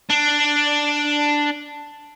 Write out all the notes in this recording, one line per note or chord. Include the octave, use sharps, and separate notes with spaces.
D4